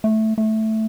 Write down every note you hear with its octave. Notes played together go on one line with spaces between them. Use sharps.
A3
A3